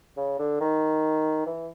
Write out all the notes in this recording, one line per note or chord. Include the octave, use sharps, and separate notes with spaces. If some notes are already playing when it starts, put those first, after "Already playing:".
C#3
D3
D#3
E3